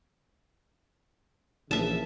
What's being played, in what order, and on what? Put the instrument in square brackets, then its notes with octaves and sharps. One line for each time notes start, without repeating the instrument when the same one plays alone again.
[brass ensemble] A#1 C#3 E3 [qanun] E5 A5